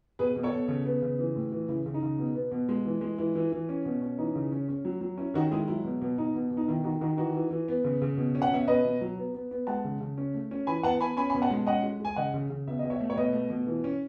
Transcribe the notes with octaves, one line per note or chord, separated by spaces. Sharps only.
B2 G#4 B4
B2
A4 C#5
B2
C#3
B3
C#3
E3
A2
E3
C#3 E4
C#3
D#4
C#3
B2
B3
B2
G#3
E3
G#3
E3 E4
E3
E3
C#4
B2
C#4
E3 D#4
C#3
C#4
C#4
F#3
F#3
C#4 E4
D#3 D#4 F#4
G#3 E4 G#4
F#3 E4
B2
B2
B2 D#4
B2
B2
D#4
D#3 E4
D#3 D#4 F#4
D#3 D#4 F#4
E3 D#4 F#4
E3
E3
B3
C#3
C#3
B2
C#4
F#5
B2 E5
B2 B4 D#5
B2
F#3
B3
B3
B3
G#3 F#5 A5
C#3
C#3
C#4
A3
C#4
E3 G#5 B5
B3 F#5 A5
B3 G#5 B5
C#4 G#5 B5
G#5 B5
B2
F#5 A5
G#3
C#4 D#5 F#5
G#3
G#3 G#5
C#3 D#5 F#5
C#3
C#3
B2 E5
B2 D#5
C#5 E5
A3
C#5
B2 B4 D#5
A3
B2
E3
C#4